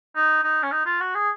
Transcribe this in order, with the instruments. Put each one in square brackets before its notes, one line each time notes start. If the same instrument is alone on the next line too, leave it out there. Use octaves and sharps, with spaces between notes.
[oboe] D#4
D#4
C#4
D#4
F4
F#4
G#4